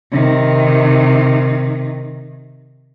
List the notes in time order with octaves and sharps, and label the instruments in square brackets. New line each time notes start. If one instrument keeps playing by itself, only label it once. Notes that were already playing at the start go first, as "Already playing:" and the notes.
[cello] C3 D#3